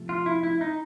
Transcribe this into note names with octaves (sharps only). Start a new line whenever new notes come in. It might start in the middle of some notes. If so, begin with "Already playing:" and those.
Already playing: C3 F3 A3
F4
E4
E4
D#4